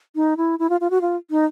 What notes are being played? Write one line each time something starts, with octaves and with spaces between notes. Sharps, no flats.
D#4
E4
E4
F4
F4
F#4
F4
D#4